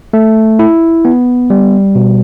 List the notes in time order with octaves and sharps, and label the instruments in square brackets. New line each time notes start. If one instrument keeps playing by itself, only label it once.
[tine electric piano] A3
E4
B3
G3
B2